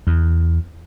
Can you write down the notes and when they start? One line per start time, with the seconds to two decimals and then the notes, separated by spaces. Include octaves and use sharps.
0.07 E2